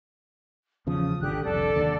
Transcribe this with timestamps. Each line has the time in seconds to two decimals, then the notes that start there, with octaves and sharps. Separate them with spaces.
0.87 E2 C#3 F3 D#6
1.20 G#1 D3 G4 F#6
1.44 F1 C2 A4 D5
1.76 D#2 D3